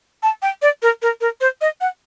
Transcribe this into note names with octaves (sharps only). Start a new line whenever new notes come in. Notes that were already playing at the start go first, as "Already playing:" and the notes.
A5
G5
D5
A#4
A#4
A#4
C5
D#5
F#5